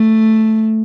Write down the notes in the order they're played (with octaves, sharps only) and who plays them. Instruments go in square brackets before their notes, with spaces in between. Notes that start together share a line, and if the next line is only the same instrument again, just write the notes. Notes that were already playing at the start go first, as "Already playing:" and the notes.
Already playing: [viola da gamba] A3